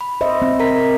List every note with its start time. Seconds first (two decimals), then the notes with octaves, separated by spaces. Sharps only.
0.01 B5
0.21 C5 D#5 E5
0.42 C4
0.59 A#4 A#5 B6